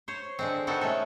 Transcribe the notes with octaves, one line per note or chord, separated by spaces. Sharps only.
C5 C#5
D3 G#3 C4
B3 C4 D#4 F#4 A4 A#4
G#3 A3 C#4 A4